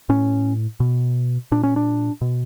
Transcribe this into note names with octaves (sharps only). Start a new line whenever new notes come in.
A2 C#4
B2
A#2 D4
C#4
D4
B2